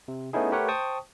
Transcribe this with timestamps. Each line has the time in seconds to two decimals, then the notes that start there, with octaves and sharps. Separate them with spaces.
0.08 C3
0.33 A3 B3 C#4 D#4 E4 G#4
0.52 A3 G4 A#4 B4 C#5 F#5
0.68 C5 G5 A5 C#6 D#6